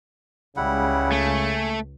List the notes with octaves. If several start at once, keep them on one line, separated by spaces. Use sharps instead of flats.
C#2 C#3 G3 E4 F#5
A3 G#5